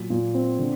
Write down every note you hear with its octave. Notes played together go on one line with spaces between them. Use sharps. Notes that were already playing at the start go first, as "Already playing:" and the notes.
Already playing: A#2 F#3
A#2
C4
D3